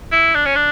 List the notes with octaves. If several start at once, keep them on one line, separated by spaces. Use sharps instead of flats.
E4
D4
C#4
D4